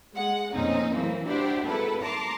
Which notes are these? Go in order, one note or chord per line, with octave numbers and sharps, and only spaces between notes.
G#3 F#5
F2 A#2 C4 C#4 D#4
E3 F#3 A3 A#3 C4
D4 E4 F#4 G4 C5
G#1 E4 A4 B4
A5 A#5 C6 D6